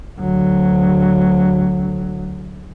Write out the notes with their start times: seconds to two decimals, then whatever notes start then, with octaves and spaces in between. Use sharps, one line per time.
0.19 D2 F#3